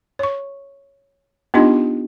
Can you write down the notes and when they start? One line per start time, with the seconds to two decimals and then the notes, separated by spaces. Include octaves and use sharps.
0.19 C#5 C#6
1.54 B3 D4 D#4 F4 G4 D#5